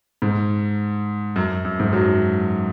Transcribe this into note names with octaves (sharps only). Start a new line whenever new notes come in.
G#2
F#2
F#2
G#2
F#2 F#3